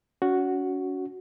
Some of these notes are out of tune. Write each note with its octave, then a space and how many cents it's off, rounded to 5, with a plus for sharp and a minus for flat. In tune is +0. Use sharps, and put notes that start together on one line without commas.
C#4 +30 F#4 +0